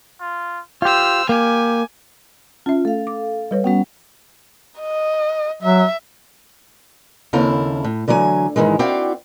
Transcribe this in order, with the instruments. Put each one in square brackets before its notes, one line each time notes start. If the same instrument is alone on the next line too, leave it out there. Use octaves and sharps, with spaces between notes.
[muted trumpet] F4
[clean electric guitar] F4 G4 [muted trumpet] C5 [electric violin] E6 F6
[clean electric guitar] A#3 [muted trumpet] G4 [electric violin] G#5
[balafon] C#4 E5 [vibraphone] F4
[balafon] A3 [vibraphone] A4 F5
[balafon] D6
G3 B4 C#5
[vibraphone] G3 C#4 F#5 [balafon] B3 F#4
[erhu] D#5
[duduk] F#3 [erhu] E5
[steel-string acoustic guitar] D#2 C#3 C4 E4 A4 F5
A2
D3 E3 F#3 E5 G#5
G#2 C3 D#3 E3 G#3
C4 E4 F#4 D5 F5 G5